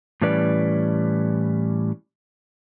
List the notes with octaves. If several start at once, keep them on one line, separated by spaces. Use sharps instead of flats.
A2 E3 G3 C#4 B4 D5